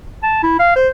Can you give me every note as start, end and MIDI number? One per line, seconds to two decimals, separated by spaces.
0.23 0.40 81
0.43 0.57 64
0.59 0.72 77
0.76 0.88 72